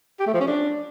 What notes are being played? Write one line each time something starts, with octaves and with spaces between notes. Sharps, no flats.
G4
A3
F3
C#4
D4